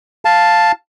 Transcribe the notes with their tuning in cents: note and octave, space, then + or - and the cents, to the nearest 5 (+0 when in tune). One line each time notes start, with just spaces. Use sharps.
F5 +0 A5 +0